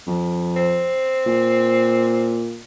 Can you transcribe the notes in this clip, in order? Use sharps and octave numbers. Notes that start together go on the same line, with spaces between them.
F2
C4
A#2